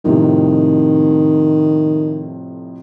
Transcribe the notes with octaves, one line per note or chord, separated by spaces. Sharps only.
F2 A2 C3 D#3